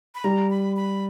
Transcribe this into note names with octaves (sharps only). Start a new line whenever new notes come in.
B5
G3 A#5
B5
B5